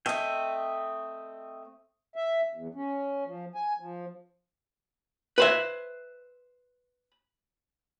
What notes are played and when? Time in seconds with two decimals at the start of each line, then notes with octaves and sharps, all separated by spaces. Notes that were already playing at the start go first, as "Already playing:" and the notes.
0.06 A3 C4 D#5 E5 G5
2.16 E5
2.55 E2
2.75 C#4
3.26 F3
3.55 G#5
3.79 F3
5.38 B4 C5 E5